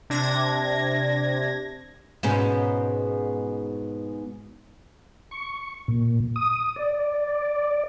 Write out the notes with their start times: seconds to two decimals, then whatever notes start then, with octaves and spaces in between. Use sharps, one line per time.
0.10 C3 D4 G#6 A#6
2.23 G#2 B2 C#4
5.31 C#6
5.88 A#2
6.36 D#6
6.76 D5